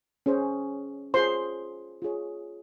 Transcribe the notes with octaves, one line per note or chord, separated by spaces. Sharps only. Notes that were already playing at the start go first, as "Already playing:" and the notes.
C#4 G#4 C5
F4 G#4 C5 C#5 C6
F4 G#4 C#5